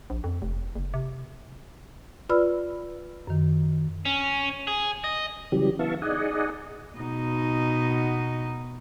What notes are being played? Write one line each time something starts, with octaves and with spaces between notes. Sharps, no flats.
A#1
F2
F1
F#1
C3
F4 B4 D5 B5 E6 F6
F#2 D#3
C#4
G#4
D#5
C#3 E3 F#3 G3 G4
E3 B3 E5 F5 A5 C#6
D#4 G#4 D5 D#5 F#5 G#5
B2 D#4